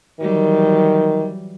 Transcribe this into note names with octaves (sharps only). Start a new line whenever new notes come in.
D#3 E3 F#3 G3